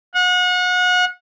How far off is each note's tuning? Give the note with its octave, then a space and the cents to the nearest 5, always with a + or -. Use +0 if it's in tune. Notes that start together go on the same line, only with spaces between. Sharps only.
F#5 -35